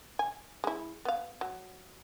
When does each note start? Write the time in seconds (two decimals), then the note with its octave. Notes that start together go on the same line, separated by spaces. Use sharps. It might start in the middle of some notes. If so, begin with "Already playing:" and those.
0.19 G#5
0.64 G#3 E4
1.05 B3 F5
1.41 F#3